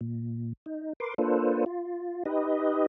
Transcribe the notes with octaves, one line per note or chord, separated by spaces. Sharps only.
A#2
D#4
A#4 B4 C6 D6
A#3 D4 F4 A4 B4 C5
F4
D#4 G4 B4 D#5